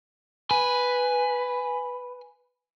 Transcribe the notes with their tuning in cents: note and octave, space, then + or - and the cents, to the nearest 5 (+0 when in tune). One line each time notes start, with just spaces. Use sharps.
B4 +0 G#5 +0